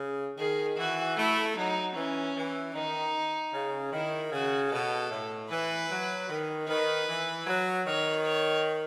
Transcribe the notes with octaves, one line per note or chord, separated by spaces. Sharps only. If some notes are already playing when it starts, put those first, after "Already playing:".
Already playing: C#3
D#3 G#4
E3 F#4
A3 E4
F#3 D#4
E3 C#4
E3
D#3 D#4
C#3
D#3 E4
C#3 F#4
B2 A4
A2
E3 B4
F#3
D#3
D#3 B4
E3
F#3
D#3 C#5
C#5